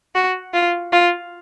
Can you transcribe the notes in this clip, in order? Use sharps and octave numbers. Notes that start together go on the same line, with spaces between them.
F#4
F4
F4